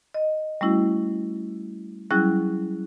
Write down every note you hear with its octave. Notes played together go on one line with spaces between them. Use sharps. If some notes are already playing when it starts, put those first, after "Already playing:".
D#5
G3 A3 C#4 E4 F#4
F#3 G3 C#4 E4 G#4 F#6